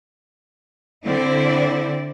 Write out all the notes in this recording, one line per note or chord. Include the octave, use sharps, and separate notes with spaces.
D3 C4 E4 D5